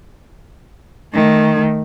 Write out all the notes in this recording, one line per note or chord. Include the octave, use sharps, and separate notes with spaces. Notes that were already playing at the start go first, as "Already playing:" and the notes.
D#3 A3